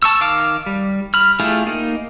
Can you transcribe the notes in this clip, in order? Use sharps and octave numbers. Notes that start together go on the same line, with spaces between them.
A5 C#6 E6
D#3 F5 D6 F6
G3
B5 F6
A3 E4 F4 G4 G#4
A#3 D#4